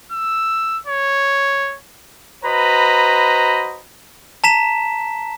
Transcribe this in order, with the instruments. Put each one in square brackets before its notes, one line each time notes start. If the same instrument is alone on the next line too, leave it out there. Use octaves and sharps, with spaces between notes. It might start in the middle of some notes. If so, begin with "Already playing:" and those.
[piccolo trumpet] E6
C#5
[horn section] F#4 B4 C5 D#5 A#5 B5
[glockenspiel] A5 A#5 B6 E7